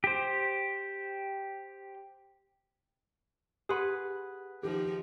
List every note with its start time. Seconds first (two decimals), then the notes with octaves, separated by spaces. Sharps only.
0.04 G4 C5
3.69 G4 G#4 B4 F#5 C6
4.63 D#3 F3 D#4 G4